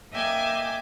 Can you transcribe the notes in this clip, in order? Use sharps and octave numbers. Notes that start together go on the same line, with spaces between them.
A#3 D#5 E5 G5 G#5 D6